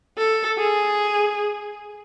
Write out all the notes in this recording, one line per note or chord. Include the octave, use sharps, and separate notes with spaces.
A4
G#4